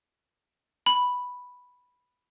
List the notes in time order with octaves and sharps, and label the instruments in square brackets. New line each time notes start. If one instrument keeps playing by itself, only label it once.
[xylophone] B5